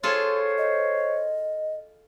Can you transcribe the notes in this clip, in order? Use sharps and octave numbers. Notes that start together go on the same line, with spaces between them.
F4 G#4 A4 C5 C#5 C6
D#5